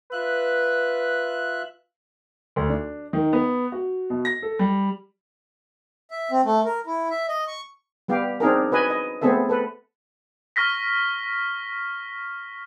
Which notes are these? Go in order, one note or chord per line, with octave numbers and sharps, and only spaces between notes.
F4 B4 E5 F#6
D2
D4
D#3
B3
F#4
B2
A#6
A4
G3
E5
C4
A3
A#4
E4
E5
D#5
C#6
G3 B3 G4 F5
C4 D4 D#4 G#4 A#4
F#4 B4 D#5 G#5
D#5
A3 B3 C4 G#4 A4 E5
A4 B4
C#6 F6 A#6 B6